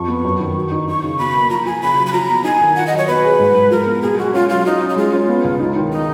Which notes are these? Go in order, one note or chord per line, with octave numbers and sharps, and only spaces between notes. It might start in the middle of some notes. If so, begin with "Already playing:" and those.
Already playing: F2 C#6
B3
F#2
D#3
F#4
D#4
D#4 C#6
C#3
B2 B5
A#3
F3 A#5
F3 G#5
C#3 B5
F#3
B5
F3 A#5
B3
D#4 G#5
D#3
F4 F#5
D#5
F#3
C#5
B2 B4
G#4
G#2
G#2
F3 A#4
B3
B2 G#4
G#3 F#4
C#4 F4
F#3 F4
C#4 D#4
C#4
D#4
G#3 F4
C#4
B3
C#2
D#4
D#3
D#4